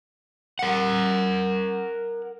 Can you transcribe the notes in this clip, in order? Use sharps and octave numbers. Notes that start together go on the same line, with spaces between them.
A#4 F#5